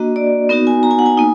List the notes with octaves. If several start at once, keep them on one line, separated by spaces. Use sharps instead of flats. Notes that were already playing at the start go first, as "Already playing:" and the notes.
Already playing: A#3 D4 F#4 D#5
D5
B3 D#4 F#4 A#4
G#5
A#5
G#5
F#5
G#5
A#3 D#4